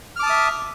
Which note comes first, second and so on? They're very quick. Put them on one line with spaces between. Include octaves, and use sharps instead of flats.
F6 D6 A5 D#6 E5